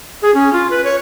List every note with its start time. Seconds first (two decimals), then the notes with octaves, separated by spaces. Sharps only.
0.22 G#4
0.35 C#4
0.53 F4
0.70 B4
0.84 C#5